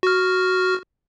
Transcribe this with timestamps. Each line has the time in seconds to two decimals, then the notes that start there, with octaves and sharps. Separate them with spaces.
0.03 F#4 F6